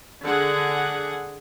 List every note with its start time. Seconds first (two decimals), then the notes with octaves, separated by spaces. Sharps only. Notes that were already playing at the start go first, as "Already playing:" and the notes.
0.24 D3 G#4 F#5